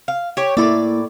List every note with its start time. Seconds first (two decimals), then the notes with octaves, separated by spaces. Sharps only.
0.08 F5
0.37 G4 C#5
0.57 A2 C#3 A#3 E4 D5